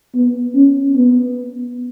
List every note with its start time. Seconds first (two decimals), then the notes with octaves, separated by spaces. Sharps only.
0.15 B3
0.55 C#4
0.96 B3